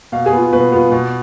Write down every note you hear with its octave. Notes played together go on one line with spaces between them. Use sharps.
B2 F5
G#4
B3 F4
B2 B4
B3 F4
B2